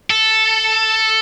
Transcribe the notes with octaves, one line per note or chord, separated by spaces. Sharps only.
A4